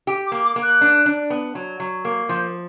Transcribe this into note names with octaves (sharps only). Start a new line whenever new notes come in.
G4
D6
A#3
D6
A#3
F#6
D4
D4
B3
F#3
F#3
A#3
F3 G6